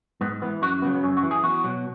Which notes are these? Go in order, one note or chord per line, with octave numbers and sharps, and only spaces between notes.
G#2 B3
E3 B3
F#2 F#4
C#3 F#3 B3
B3
F#2 C#4
F#4
E3
G#4
E2 F#4
B2 F#3